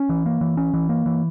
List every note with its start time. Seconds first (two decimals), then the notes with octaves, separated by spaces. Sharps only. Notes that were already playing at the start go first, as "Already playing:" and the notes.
Already playing: C#4
0.09 E3
0.26 A#3
0.41 E3
0.57 C#4
0.74 E3
0.89 A#3
1.06 E3